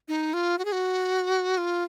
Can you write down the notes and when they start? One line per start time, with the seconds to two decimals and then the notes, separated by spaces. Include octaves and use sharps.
0.08 D#4
0.34 F4
0.58 F#4
0.65 G#4
0.72 F#4
1.58 F4